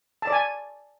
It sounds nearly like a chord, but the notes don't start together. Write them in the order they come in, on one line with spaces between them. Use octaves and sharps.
A5 D5 G#5